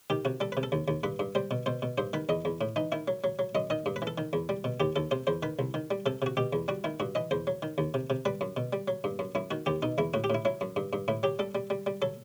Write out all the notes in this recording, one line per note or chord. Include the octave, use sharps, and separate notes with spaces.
D#3 G4
C3 F#4
G3 A4
C3 B4
A4
D#2
D#2
G2 B4
G2
G3 C5
B2
B2 C5
B2
G2 C5
D#3 B4
E2 D#5
E2
A2
E3 D#4
D#3 E4
F#3
F#3
F#3
F#2 D#5
D#3 D#5
G2
B4
E3
A4
D#3
E2
G3
B2
D#2 G4
D#2 A4
C3 C5
E2 C5
D#3 B4
C2
D#3
G3
C3 A4
C3 F#4
B2 G4
E2
G3 F#4
D#3 E4
G2 F#4
E3 D#5
E2 C5
F#3
D#3
D#2
C3
C3
G3 B4
F#2
B2
G3
F#3
G2
F#2
F#2 E4
D#3 F#4
D#2 G4
B2 D#4
E2 E4
A2 F#4
G4
A2 E4
F#3 E4
F#2
G2
G2
A2 E4
F#3 G4
G3 A4
G3
G3
G3
F#3 A4